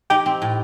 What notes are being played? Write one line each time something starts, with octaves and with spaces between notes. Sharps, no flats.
D#4 G4
C4
A2